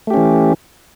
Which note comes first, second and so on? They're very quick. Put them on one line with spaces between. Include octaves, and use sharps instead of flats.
A3 G4 C#4 E3